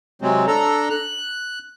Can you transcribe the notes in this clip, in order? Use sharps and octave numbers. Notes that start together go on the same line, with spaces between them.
C3 F#3 G#3 C4
D4 A4 A#5
F#6